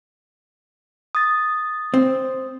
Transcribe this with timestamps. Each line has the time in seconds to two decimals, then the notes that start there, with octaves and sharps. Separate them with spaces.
1.15 D#6 A6
1.94 C4